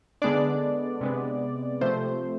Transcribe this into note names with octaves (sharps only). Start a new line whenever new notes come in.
D3 G#3 B3 D4 D5
C3 G#3 B3
C3 F3 A3 C5